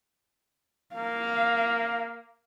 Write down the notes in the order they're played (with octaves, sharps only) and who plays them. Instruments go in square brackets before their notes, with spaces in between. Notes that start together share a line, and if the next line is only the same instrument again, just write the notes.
[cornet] A#3 [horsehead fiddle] F5